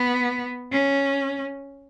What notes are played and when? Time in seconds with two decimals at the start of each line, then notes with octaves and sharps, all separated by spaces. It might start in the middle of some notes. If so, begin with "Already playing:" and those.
Already playing: B3
0.72 C#4